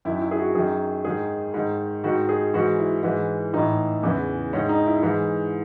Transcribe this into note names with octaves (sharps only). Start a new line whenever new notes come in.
F#2 D#3 E4
E4
G#4
F#4
F#2 D#3 G#4
G#2 D#3 G#4
G#2 D#3
G#2 D#3 F#4
G#4
G#2 E3 F#4
E4
G#2 E3
A2 E3 D#4
E2 C#3 E3
G#2 D#3 C#4
D#4
E4
G#2 E3